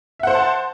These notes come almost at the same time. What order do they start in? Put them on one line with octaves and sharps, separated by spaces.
E5 F#5 C5 C6 A5